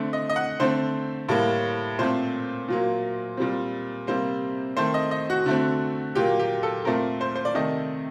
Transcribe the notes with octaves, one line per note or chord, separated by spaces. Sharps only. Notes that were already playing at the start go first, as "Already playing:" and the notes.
Already playing: D3 A3 C4
D#5
D#5
F#5
D3 A3 C4 C5
A2 G3 A#3
A#2 A3 C4 C5
A#2 F#3 A#3
A#2 G3 C4
C3 G3 A#3 C5
D#3 A3 C4 C5
D#5
D#5
F#4
D3 A3 C4
A#2 F#3 A#3 G4
G4
A4
A#2 A3 C4 A#4
C5
C5
D5
C3 D#3 A3 D#5